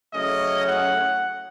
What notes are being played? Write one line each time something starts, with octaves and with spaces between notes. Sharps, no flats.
C#3 F#3 A3 C#4 E4 D#5
F#5